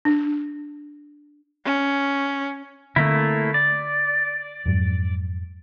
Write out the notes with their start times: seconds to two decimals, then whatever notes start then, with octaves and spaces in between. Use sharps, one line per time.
0.05 D4
1.65 C#4
2.96 D3 A3 A#3 C4 E4
3.54 D5
4.66 F2 G#2 F#3